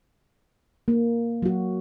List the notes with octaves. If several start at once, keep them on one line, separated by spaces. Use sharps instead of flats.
A#3
F#3 F#4